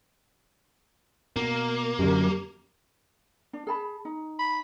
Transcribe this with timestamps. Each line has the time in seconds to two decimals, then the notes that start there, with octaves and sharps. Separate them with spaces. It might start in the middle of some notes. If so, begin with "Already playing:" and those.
1.36 B2 A#3
1.99 F#2 D3 F#3 G4
3.53 D4
3.67 G#4 A5 B5
4.05 D#4
4.39 B5